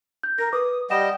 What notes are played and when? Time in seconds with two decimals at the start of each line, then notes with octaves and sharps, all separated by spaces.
0.23 G6
0.39 A#4 A#6
0.53 B4 D6 D#6
0.90 G3 D#5 F#5 G5 E7